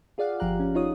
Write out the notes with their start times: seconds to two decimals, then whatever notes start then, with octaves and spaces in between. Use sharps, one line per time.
0.18 F4 G#4 D5 F5 F#5
0.40 G1 F3 G4 F5 A#5 F#6
0.60 C#4
0.74 D#4 F4 C#5 D#6